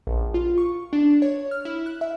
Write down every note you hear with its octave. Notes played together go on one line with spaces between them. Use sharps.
A#1
F4
C#6
D4
C#5
F6
E4
F#6
E5